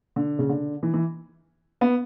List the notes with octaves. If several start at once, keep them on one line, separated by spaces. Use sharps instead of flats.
D3
C#3
D3
E3
E3
B3